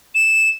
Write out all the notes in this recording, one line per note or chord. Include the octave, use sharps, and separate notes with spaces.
E7